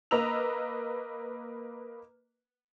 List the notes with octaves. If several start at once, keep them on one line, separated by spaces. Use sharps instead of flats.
A#3 B4 D#5 A#5 E6 F7